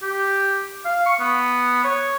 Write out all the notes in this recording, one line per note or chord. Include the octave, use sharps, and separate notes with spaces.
G4
F5
C#6
B3
C#5